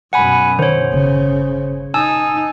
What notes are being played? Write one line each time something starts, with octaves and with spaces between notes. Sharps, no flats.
F#2 B2 F#5 G#5 B5
D#3 C5 C#5
G1 C#3
D#4 G#5 A5 E6